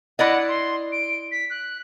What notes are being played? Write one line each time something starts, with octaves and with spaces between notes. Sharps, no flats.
E4 D5 D#5 F#5
C6
D7
B6
F#6